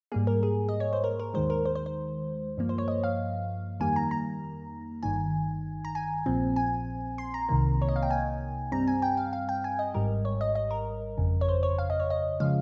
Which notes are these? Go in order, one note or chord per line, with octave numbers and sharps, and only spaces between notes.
G#2 G3 A#3 G#4
A#4
G#4
D#5
C#5
C5
A#4
A#4
D#2 D#3 G#3 C5
A#4
C5
C5
C5
G2 F3 A#3
C5
C#5
D#5
F5
F2 D#3 G3 A#3 G#5
A#5
A#5
G1 G2 D#3 G#5
A#5
G#5
A#1 A#2 F3 C4
G#5
C6
A#5
C2 C3 D#3 A#3
C#5
D#5
F5
G5
G#5
G2 G3 C4 A#5
G#5
G5
F5
F5
G5
G#5
D#5
G#1 G#2 G3 A#4
C#5
D#5
D#5
A#4
G1 F2 C#3
C#5
C5
C#5
F5
D#5
C#5
D#5
C#3 F3 G#3 F5